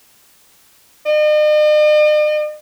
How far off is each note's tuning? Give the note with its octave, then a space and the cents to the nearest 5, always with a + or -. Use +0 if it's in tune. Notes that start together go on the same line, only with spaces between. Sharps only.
D#5 -45